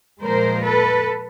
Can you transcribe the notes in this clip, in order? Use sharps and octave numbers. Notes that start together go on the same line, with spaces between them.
A#2 F3 G#3 A#4 C5
A4 B4